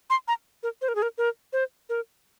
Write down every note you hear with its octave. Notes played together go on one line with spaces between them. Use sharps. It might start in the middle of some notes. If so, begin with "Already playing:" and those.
C6
A#5
A#4
C5
A#4
G#4
A#4
A#4
C5
A#4